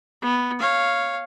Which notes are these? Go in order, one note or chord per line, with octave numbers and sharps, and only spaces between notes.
B3
C#5 F5